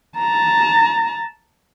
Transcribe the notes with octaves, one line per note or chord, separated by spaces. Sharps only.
A5 A#5